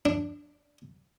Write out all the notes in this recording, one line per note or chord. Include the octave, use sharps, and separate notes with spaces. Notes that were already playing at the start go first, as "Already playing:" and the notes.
D4